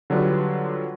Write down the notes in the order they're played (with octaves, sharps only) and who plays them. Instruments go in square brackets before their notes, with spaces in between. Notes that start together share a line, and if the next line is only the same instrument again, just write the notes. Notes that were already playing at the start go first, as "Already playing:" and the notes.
[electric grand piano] D3 F#3 G3 D4 F4 B4